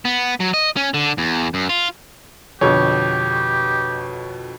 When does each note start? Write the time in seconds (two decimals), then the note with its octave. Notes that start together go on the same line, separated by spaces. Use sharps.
0.05 B3
0.40 F#3
0.54 D#5
0.77 C#4
0.94 D3
1.18 E2
1.54 F#2
1.69 F4
2.61 F2 B2 D3 G4 C#5